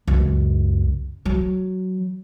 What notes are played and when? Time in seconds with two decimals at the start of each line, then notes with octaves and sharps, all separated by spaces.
0.07 C#2 F#2
1.25 F#3